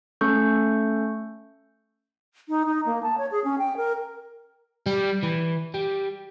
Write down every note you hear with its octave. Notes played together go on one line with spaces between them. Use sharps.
A3 C#4 A4 C#6 G6
D#4
D#4
A#3
A5
C#5
G#4
C#4
G5
A#4
G3
E3
G3